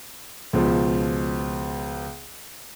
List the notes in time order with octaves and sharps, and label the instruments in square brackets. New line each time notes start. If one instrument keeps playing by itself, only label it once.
[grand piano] C#2 B2 F3